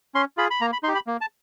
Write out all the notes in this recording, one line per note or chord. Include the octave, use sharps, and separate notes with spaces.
C#4 C6
F4 G#4 B5
B5
A#3 A#5
B5
D#4 G4 C6
B5
A#3
A5